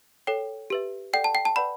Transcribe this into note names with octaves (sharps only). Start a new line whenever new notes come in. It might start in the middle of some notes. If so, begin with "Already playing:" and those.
A4 C#5 G5
G4 B4 E5
A4 D5 F#5 G5
A5
G5
A5
B4 D5 F#5 B5